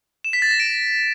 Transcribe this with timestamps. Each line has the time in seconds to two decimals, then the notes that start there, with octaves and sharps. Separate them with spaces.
0.24 E7
0.33 B6
0.42 A6
0.51 A#6
0.60 D7